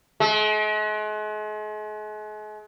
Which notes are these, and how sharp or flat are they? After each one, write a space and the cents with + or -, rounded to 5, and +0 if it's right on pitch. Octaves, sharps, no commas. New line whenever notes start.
G#3 +40